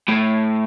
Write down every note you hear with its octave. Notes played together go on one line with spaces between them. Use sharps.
A2